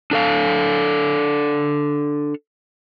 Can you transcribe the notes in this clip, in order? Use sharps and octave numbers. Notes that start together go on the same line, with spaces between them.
D4 A4 F5